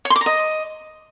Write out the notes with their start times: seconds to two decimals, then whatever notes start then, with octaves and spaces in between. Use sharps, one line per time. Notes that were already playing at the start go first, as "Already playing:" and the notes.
0.05 C#5
0.10 C6
0.16 D6
0.21 A#5
0.26 D#5